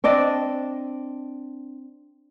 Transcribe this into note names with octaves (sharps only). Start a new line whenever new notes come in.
C4 D4 D5 D#5